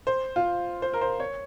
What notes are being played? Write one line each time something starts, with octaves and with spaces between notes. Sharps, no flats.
C5
F4
C5
A#4
C5
C#5